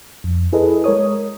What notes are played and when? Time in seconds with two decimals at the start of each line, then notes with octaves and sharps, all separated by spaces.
0.24 F2
0.53 E4 G#4 A4 B4 D#5
0.84 G#3 A#4 C#5 D#6